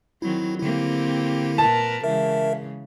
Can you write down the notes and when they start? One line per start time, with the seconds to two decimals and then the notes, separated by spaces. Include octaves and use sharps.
0.22 D#3 F#3 C4 E4
0.60 D3 A#3 C4 E4 G4
1.58 A#2 A#4 B4 A5
2.04 C#3 E3 G#3 A#4 E5